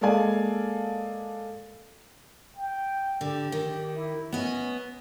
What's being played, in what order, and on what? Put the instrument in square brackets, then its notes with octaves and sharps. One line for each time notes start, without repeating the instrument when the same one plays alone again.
[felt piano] G#3 A#3 A4 D5 F5 G#5
[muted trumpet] G5
[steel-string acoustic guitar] D3 [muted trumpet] G4
[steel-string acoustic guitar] D#3
[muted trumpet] E4
[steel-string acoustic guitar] B3 D#5 [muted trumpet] C#4